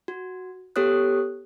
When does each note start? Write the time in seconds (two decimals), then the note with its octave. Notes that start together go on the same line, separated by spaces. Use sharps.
0.08 F#4
0.76 B3 G4 A4 C#5 D#6 F#6